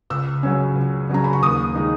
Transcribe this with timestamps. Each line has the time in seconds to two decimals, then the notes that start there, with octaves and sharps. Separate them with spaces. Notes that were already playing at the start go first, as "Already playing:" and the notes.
0.10 C#2 E6
0.43 C#3 F#3 C#4
0.76 C#2
1.09 C#3 F#3 C#4 A#5
1.24 B5
1.33 C#6
1.42 D#2 D#6
1.75 D#3 G#3 D#4